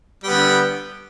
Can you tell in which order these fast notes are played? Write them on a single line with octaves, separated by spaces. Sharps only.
G3 B3 D3